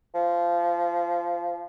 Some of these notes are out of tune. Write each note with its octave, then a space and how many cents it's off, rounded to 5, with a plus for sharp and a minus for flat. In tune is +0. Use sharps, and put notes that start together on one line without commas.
F3 -15